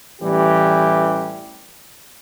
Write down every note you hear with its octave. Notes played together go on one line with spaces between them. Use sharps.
A1 E3 G3 G4